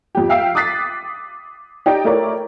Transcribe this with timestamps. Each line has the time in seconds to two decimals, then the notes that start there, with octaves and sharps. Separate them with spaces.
0.15 F2 G4
0.29 E5 F5 G5 E6 C7
0.55 D6 D#6 F#6 A6 B6 C7
1.86 D#4 G4 D5 G5
2.05 A3 E4 A#4 C#5 D5